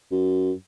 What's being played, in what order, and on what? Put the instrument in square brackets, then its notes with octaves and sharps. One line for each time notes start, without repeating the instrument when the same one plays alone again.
[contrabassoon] F#2